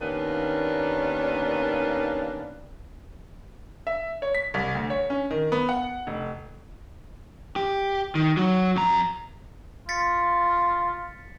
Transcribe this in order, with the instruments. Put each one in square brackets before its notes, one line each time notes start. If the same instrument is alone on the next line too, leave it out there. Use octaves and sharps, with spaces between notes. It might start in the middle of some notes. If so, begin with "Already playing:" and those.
[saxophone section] D#2 D#3 A#3 B3 C#4 D4
[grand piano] E5
C#5
B6
C2
D2
C#5
C#4
D#3
B3
F#5
F1
[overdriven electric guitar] G4
D#3
F#3 F#4
F2 A#5
[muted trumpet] F4 [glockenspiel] A6 B6 C#7